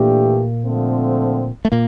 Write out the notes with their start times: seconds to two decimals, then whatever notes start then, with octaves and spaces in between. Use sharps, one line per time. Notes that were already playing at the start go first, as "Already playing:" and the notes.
Already playing: A#2 E3 A3 A#3 D4 G4
0.65 D3 F3 A3 C4
1.65 A3
1.72 A#2 A#3